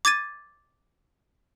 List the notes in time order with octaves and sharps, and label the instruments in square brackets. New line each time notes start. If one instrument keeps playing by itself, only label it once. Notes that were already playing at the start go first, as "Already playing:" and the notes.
[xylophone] D6 G#6 A6 D#7